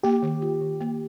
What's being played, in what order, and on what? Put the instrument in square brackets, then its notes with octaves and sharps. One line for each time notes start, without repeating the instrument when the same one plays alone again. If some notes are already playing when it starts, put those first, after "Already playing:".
[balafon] A#3 [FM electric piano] G4
[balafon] D#3
F4
D#3
A#3